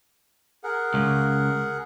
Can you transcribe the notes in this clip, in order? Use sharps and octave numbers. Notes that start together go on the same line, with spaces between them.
G#4 A#4 F#5
C#2